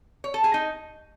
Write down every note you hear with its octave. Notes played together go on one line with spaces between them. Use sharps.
C#5
A4
G#4
D#4